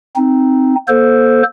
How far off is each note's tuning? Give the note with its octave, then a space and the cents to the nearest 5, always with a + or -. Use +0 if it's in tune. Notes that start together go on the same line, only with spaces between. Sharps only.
C4 +0 D#4 +0
A#3 +35 A4 +0 C5 +0